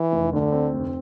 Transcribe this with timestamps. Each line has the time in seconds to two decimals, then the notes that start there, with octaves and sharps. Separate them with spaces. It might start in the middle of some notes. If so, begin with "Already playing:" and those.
Already playing: E3
0.12 F1
0.32 D2 D3
0.52 C4
0.73 F1